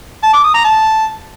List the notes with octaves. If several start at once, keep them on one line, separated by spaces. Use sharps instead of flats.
A5
D6
D#6
A#5
A5